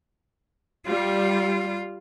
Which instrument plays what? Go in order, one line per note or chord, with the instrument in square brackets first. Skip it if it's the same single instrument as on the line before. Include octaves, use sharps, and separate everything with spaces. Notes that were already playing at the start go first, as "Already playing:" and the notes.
[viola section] G3 [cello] F4